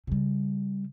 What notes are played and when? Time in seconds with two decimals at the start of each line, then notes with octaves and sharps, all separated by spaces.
0.07 C#3 G3